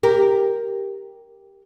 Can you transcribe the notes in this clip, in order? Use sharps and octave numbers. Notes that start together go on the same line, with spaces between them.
G4 A#4